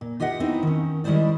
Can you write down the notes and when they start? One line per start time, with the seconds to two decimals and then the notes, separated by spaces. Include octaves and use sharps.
0.01 A#2
0.20 F4 G4 D#5 E5 F#5
0.40 B3 C4 D#4 E4
0.63 D#3 C#4
1.04 D#3 G3 G#3 E4 C5 D5